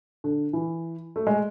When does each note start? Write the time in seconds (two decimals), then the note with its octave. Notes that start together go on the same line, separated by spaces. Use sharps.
0.24 D3
0.53 E3
1.16 A3
1.27 G#3